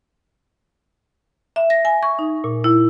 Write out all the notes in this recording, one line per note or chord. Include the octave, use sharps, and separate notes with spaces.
E5
A#6
G#5
C#6
D#4
A#2
E4